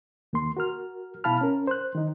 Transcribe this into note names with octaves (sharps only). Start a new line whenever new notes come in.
D#2 A#3 C6
F#4 A#4 F6
B2 E4 F5 A5 B5 F6
C#4 A#4
C5 F#6
D#3 D#4